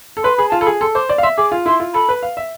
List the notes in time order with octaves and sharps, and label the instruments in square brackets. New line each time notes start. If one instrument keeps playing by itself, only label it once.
[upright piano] A4
[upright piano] B4 [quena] C6
[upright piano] G#4 [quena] B5
[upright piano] F4 [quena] A5
[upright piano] A4 [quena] B5
[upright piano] G#4
[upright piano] A4 [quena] C6
[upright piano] C5 [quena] D6
[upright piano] D5
F5
[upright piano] E5 [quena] C6
[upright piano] G#4 [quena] D6
[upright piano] F4
[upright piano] E4 [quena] C6
[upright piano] F4
[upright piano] A4 [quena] B5
[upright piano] B4
F5
E5